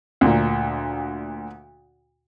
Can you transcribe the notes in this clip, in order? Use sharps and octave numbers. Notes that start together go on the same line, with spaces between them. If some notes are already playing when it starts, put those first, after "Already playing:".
D2 A#2